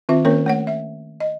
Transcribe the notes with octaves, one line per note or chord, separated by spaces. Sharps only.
D#3 C4 F4 E5
D#3 A#3 C#4 A#4 C#5
A3 C#5 F#5
E5
D#5